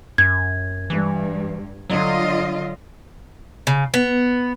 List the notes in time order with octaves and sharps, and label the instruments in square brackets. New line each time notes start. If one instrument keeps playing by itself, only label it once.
[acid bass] F#2 [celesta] G#6
[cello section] G2 [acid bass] E3
[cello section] D3 F4 D#5 [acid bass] F#3
[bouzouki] C#3
B3